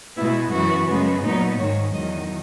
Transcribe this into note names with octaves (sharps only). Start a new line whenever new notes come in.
B2 G#3 B3 E4
F#2 E3 B3 F#4
F#2 C#3 G#3 B3
A#2 F#3 B3 D#4
G#2 D#3 G#3 C#5
E2 D#3 F#3 D#5